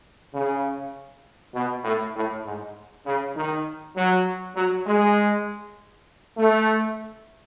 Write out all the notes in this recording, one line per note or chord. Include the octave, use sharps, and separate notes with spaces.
C#3
B2
A2
A2
G#2
C#3
D#3
F#3
F#3
G#3
A3